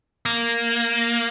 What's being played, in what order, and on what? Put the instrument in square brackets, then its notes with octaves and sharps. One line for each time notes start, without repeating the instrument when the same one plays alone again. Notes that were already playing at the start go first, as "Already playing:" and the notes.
[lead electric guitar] A#3